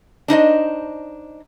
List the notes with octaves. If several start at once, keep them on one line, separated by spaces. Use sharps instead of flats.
D4 D#4 C5 D#5